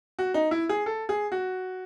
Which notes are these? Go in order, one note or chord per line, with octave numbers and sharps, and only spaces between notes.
F#4
D#4
E4
G#4
A4
G#4
F#4